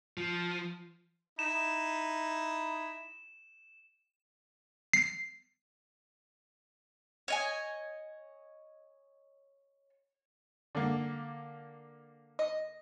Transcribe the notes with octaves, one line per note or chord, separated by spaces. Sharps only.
F3
D#4 E4 E7
C7
C#5 D#5 G#5
D3 A#3
D#5